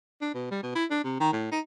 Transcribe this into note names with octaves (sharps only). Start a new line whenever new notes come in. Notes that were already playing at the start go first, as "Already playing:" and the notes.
D4
B2
G3
B2
E4
D4
C3
D#3
A2
D#4